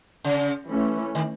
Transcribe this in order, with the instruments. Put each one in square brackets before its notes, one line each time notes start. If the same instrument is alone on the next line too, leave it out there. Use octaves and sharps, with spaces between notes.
[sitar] C#3
[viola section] E3 A3 C#4
[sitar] D#3